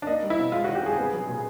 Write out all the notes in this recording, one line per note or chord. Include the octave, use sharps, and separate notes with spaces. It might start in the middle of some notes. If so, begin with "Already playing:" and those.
D4
A#3 D#4
G3
E4
B2
G#3 F4
F#4
D#3
G4
G2 G#4
B3
F#3
A#2